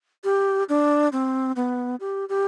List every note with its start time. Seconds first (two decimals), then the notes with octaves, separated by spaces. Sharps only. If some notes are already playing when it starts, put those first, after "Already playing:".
0.24 G4
0.69 D4
1.12 C4
1.56 B3
2.00 G4
2.29 G4